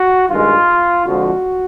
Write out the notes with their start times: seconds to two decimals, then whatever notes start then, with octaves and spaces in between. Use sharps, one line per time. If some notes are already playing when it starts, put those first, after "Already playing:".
Already playing: F#4
0.29 G2 D#3 G#3 F4
1.05 F2 D3 F3 G#3 F#4